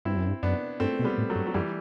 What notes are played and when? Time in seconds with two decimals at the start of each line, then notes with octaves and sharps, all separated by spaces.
0.05 G2 C4 E4
0.17 F#2
0.28 G2
0.43 F#2 B3 D4
0.80 G2 A3 C4
0.99 B2
1.04 G3 B3
1.18 A2
1.30 F#3 A3
1.36 G2
1.47 F#3
1.54 F#2 E3 G3